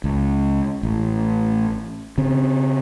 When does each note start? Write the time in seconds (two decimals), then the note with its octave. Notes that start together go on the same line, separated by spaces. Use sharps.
0.04 C#2
0.83 A1
2.18 C#3 C4